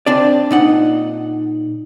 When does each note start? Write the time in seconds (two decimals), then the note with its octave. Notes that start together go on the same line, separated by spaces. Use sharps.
0.06 C4 D4 D5
0.51 A#2 D#4 F#5